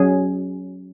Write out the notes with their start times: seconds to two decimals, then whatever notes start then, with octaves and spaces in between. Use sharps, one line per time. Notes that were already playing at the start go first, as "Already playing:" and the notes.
Already playing: F#3 C#4 G#4